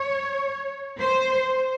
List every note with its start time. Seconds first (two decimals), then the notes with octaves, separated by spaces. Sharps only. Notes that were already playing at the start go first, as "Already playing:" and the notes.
Already playing: C#5
0.99 C5